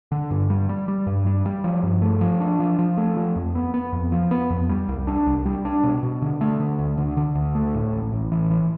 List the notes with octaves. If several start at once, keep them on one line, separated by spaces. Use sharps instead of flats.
D3
G2
G3
G3
G3
G2
G3
G3
F3
G2
A3
F3
D4
F3
F3
A3
F3
F2
B3
B3
F2
F3
B3
F2
G3
C2
D4
C2
G3
D4
B2
B2
D3
A3
D3
D2
D3
D3
D2
A3
A2
A1
A1
E3
E3